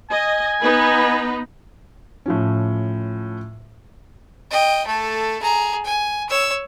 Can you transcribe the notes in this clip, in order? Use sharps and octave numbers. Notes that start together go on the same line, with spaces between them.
D#5 G#5
B3 D#4 B4
A2 F3 C#4
D#5 G5
A3 A4
G#4 A#5
G#5
C#5 E6